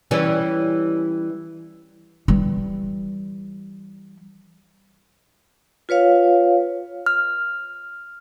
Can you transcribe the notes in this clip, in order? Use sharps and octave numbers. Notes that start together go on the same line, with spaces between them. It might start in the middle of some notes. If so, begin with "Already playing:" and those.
E3 G3 C#4
E3 G3
F4 B4 C#5 F5
F6